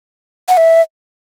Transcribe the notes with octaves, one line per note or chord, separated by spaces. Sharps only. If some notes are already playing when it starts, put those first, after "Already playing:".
F#5
E5